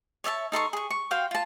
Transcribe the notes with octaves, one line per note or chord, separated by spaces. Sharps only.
C#5 D5 E5 A5
D#4 A4 C6 C#6
G#4 C#6
C#6
F#4 F5 G5 C6
F4 A5